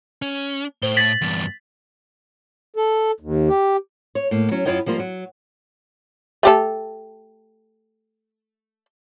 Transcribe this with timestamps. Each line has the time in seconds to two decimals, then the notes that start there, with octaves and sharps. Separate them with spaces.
0.22 C#4
0.82 A2 C5 G7
0.97 A6 B6 F#7
1.21 E2 G2
2.76 A4
3.20 D#2
3.49 G4
4.15 C#5
4.31 A2 A#3
4.51 F#3 C#4
4.65 F#2 E4 F4 C#5 D#5 G5
4.86 F3 G3 A#3 F4
4.99 F#3
6.43 A3 G4 A4